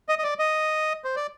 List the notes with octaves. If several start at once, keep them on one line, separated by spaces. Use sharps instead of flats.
D#5
D#5
D5
D#5
C5
D5